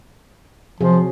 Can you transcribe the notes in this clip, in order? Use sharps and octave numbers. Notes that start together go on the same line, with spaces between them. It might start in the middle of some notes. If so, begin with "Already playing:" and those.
C3 F3 F#3 G#4